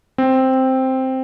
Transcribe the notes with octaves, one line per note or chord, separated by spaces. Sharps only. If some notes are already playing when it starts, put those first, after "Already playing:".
C4